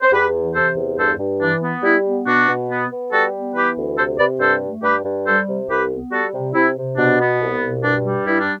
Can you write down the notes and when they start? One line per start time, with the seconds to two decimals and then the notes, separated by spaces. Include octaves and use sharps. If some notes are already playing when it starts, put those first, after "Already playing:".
0.01 C5
0.11 E2 G4 B4
0.33 E3
0.54 C3 A4 C5
0.76 E2
0.97 G2 A4 C5
1.19 G2
1.40 E3 D4
1.62 B3
1.83 G3 E4
2.05 B3
2.26 B2 D4 F#4
2.47 B2
2.69 B3
2.90 B3
3.11 G3 F#4 A4
3.33 B3
3.54 E3 G4 B4
3.76 D2
3.97 C3 A4 C5
4.18 C3 B4 D5
4.40 G2 A4 C5
4.62 A3
4.82 G2 G4 B4
5.05 G2
5.26 G3 A4 C5
5.47 C3
5.68 C2 G4 B4
5.91 B3
6.11 G3 F#4 A4
6.34 C3
6.54 C3 E4
6.76 C3
6.97 B2 D4
7.19 B3
7.40 C2
7.62 B2
7.82 G2 D4
8.04 G3
8.27 G2 E4
8.39 D4